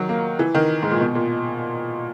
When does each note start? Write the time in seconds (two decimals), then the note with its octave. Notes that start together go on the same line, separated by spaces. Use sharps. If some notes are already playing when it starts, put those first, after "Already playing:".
Already playing: D#3 F#3
0.09 A#3
0.39 E3
0.55 D#3
0.83 G#2
0.91 A#2
1.01 B2
1.15 A#2